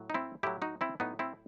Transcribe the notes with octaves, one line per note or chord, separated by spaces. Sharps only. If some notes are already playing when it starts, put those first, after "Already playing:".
Already playing: A2 F#3
D#4
C4 E4
A2 F#3 E4 G4
D#4 F#4
C4 E4
A2 F#3 B3 D#4
C4 E4